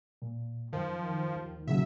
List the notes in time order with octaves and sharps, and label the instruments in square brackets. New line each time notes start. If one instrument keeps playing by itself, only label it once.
[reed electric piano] A#2
[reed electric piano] F#2 [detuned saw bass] D#3 [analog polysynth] F3
[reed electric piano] D#2
[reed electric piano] A#2 C#3 F#3 [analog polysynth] E5